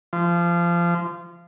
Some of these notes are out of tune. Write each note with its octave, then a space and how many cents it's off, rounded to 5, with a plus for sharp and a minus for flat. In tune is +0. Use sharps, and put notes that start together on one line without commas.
F3 -25